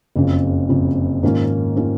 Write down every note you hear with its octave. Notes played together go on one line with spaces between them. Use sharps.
F#1 F2 C#3
F#1 F2 C#3
G#2 D#3 A#3 C#4 F4
D#3 A#3 C#4 F4